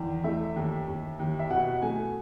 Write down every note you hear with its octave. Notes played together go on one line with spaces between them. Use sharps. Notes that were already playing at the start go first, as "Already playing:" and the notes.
Already playing: E2 D#3
A3 E5
D#2
D#2
D#2
E5
B2 F#5
A3 G#5